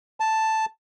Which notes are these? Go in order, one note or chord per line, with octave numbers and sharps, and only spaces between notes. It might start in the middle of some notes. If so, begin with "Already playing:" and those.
A5